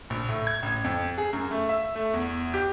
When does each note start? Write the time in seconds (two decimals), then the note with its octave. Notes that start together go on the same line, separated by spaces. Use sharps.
0.10 A#1
0.29 A2
0.47 G#6
0.63 A1
0.84 F2
1.18 G#4
1.33 F#2
1.51 A3
1.69 E5
1.95 A3
2.14 E2
2.54 G4